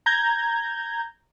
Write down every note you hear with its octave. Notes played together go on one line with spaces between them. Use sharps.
A#5 G6 G#6